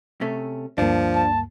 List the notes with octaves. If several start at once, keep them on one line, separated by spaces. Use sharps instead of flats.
C3 A3 C#4
D2 G2 F3 A#3 D4
A5